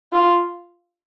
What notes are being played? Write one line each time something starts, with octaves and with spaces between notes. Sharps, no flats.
F4